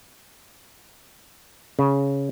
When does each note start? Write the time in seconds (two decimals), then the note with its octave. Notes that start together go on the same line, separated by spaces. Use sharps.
1.79 C#3